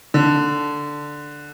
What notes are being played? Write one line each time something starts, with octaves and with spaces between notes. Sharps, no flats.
D3